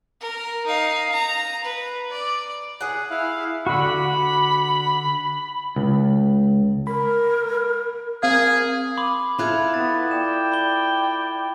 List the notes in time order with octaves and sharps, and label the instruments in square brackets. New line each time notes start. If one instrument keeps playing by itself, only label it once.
[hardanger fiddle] A#4
D#4 F5
A#5
B4
D5
[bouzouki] G#4 F#5
[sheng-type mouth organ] E4 F5
[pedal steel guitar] D3 F#4 [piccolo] B5
[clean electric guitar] C#2
[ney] A#4 [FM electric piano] B5
[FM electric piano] C4 F5 [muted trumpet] G#4 [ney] A#4
[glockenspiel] B5 C6 D6
[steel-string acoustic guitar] E4 F4 A4 [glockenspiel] B5 F#6 G#6
[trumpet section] B3 [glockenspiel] A6
[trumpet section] D5 G5 [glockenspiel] E7
[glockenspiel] B5 G7